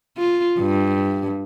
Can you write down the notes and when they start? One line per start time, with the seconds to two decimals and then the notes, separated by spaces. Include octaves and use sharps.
0.17 F4
0.59 G2